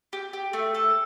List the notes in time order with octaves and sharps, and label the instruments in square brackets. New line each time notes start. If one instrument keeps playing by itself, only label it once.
[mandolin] G4
G4
A3
A4